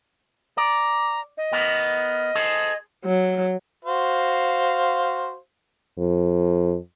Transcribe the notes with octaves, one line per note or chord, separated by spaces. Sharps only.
D5 A#5
D#5
B3 A#4
G#4 A4 C5
F#3
F#4 C5 F5
F2